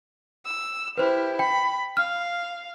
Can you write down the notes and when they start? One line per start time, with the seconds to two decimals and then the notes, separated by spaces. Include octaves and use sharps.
0.45 E6
0.98 E4 G4 B4 C5
1.39 G5 B5
1.97 F5 F6